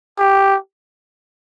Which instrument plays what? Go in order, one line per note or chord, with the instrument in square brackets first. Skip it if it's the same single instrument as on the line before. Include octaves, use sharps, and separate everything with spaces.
[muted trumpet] G4